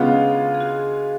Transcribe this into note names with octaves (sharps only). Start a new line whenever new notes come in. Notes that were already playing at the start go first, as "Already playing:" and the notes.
Already playing: C#3 G#3 B3 D4 F4
G#4
F#4